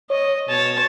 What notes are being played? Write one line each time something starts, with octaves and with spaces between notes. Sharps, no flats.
C#5 D#5
B2 C#5 A5